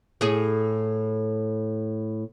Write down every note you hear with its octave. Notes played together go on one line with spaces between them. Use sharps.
A2 G#4